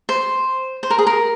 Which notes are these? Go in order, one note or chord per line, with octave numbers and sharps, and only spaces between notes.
C5
C5
A#4
G#4
A#4